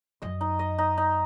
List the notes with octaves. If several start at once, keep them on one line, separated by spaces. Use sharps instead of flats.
F#2 D#5
D#4
D#5
D#4
D#4